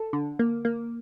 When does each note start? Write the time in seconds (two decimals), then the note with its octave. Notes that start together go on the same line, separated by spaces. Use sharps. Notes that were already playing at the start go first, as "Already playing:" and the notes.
Already playing: A4
0.13 D3
0.39 A#3
0.65 A#3